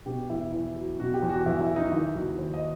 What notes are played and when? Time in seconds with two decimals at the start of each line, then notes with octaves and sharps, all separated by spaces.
0.06 B2 G4
0.30 E2 E4
0.52 E2 E4
0.76 F#3
0.99 B2 F#4
1.14 G4
1.22 E2
1.29 F#4
1.46 E2 E4
1.60 E4
1.69 F#3
1.76 D#4
1.92 D#3 E4
2.15 D#2 F#4
2.38 D#2 C5
2.54 D#5